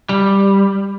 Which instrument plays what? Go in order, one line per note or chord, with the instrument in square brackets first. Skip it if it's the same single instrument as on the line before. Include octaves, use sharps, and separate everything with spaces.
[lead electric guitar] G3